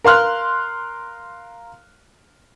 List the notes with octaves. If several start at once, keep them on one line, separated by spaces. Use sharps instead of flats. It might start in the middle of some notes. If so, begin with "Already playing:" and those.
A#4 F5 C6 F6 F#6